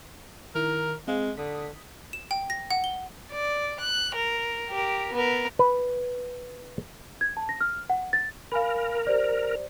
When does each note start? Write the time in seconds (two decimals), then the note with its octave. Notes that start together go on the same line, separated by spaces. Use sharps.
0.55 D#3 E4 A#4 A#5
1.08 G#3 C4 G#4 F5
1.37 D3 D#6 B6
2.13 E7
2.31 G5
2.50 A#6
2.71 F#5
2.84 G7
3.32 D5
3.80 F#6
4.15 A#4
4.70 G4 A#4
5.13 B3 A#4
5.59 B4
7.21 G#6
7.37 A5
7.49 A#6
7.61 F6
7.90 F#5
8.13 A6
8.52 A#4 F5 G#5 B5
9.07 G4 C5 D5